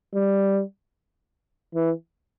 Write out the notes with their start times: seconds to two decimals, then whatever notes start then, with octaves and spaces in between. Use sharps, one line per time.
0.15 G3
1.75 E3